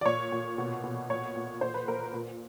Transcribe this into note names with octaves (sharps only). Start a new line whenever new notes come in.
D5
A#2 C#5
A#2
B2
B2
A#2 C#5
A#2
A#2 C5
B4
A#2 A#4
A#2